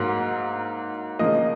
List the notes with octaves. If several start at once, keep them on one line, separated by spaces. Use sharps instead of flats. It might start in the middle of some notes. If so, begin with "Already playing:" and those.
Already playing: G#2 F#3 A#3 F5
C#3 F3 A#3 D#5